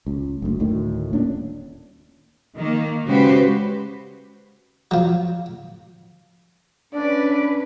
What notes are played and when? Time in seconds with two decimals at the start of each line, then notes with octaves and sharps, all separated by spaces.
0.07 C#2
0.42 F#1 D2
0.60 D2 A2 D#3
1.13 D#1 A#2 C#4 D4
2.56 D#3 A#3
3.06 C#3 G#3 F#4 G4 B4 C5
4.91 F3 F#3
6.94 C#4 D4 B4 D5